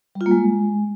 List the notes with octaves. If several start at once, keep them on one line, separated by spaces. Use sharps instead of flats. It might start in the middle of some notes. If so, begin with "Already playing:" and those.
G3
F4
A#3
G#3